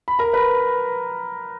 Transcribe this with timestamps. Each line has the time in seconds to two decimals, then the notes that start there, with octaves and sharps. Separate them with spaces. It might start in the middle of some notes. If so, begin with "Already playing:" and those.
0.08 B5
0.19 A#4 A#5
0.33 B4 B5